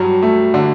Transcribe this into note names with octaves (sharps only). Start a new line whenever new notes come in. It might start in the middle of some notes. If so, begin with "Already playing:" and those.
Already playing: G2 F#3
A3
D3